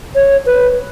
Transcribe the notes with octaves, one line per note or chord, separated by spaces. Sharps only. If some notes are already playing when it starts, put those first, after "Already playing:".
C#5
B4